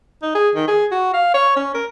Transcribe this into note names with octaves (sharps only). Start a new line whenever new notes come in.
D#4
G#4
D#3
G#4
F#4
F5
C#5
C#4
A#4